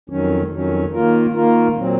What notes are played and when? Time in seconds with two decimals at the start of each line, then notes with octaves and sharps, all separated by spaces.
0.10 F2 D#3 F#3 C#4
0.51 F2 D#3 F#3 C#4
0.93 D#3 A#3 F4 A#4
1.34 D#3 A#3 F4 A#4
1.76 A#2 F#3 C4